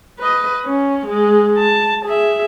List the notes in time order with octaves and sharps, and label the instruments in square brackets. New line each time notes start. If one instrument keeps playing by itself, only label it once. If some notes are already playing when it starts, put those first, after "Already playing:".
[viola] B4 D#5
C#4
G#3
A5
G#4 E5